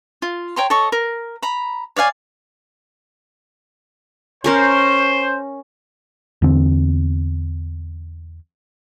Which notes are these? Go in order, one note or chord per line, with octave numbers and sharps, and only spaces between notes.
F4
C#5 G5 A#5 C6
A4 C#5 D#5 C#6
A#4
A#5 B5
C#5 D5 F5 G#5
C#4 A#4 C5 C#6
E2 D3 C4